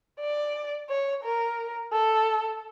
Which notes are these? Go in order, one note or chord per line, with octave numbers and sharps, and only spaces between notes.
D5
C#5
A#4
A4